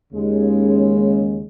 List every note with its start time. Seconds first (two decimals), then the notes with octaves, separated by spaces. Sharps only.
0.12 D#2 C#3 G#3